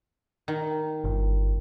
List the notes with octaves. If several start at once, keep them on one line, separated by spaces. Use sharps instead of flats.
D#3
G1